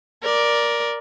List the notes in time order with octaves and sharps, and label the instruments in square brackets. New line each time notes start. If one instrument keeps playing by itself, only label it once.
[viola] A#4 D5